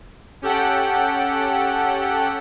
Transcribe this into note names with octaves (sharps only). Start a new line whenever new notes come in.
C#4 G4 A4 F#5 G5